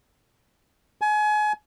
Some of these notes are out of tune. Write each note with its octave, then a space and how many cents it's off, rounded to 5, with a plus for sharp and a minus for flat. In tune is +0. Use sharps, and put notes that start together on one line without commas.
G#5 +30